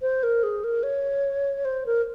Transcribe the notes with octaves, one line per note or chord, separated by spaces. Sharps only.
C5
A#4
G#4
A#4
C#5
C5
A#4